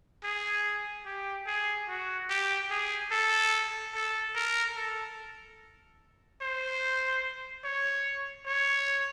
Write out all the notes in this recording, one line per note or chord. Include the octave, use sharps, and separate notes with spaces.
G#4
G4
G#4
F#4
G4
G#4
A4
A4
A#4
A4
C5
C#5
C#5